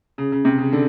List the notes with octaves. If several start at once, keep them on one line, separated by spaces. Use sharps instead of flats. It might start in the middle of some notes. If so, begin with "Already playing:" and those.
C#3
C#3
C3
C#3
D3